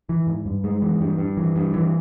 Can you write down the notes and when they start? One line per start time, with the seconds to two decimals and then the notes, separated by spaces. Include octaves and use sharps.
0.09 E3
0.27 G#2
0.46 G2
0.64 G#3
0.82 E3
1.01 G2
1.18 G2
1.37 E3
1.56 G2
1.74 E3